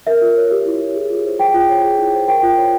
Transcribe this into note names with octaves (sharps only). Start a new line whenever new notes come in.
A#4 E5
F4
C#5
G4
E4
C#5
G#4
F4
C5
G#4 G5
F4
C#5
G#4
E4
C5
A#4 G5
F4
C#5